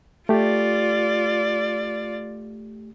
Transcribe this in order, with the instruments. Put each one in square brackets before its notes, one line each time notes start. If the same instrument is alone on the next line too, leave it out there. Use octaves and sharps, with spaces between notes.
[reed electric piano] A3 G4 [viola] F4 D5